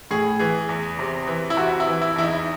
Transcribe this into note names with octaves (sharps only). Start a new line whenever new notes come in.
A2 G#4
E3 G#4
E2
C3
E3
E4
C3 F#4
E4
E3
E4
E2 E4
D#4